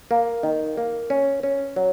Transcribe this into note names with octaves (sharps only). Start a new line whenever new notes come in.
A#3
D#3
A#3
C#4
C#4
F#3